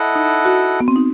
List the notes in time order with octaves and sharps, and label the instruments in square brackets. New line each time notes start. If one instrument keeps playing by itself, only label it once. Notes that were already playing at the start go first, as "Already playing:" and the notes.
Already playing: [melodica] E4 A4 D#5 F#5
[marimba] D#4
F#4
B3
C4
D#4